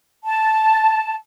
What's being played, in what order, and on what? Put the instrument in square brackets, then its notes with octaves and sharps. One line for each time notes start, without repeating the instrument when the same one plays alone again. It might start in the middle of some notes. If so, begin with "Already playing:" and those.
[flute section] A5